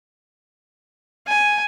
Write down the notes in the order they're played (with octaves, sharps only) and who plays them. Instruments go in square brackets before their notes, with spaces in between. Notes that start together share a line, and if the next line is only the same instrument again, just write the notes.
[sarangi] G#5